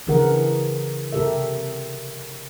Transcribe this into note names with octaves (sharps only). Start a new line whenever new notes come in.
C#3 E3 D4 G#4 A#4 F#5
C3 G4 A4 A#4 E5